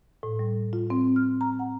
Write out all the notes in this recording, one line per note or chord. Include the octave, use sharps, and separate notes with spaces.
A2
G3
F4
C4
F6
A#5
F#5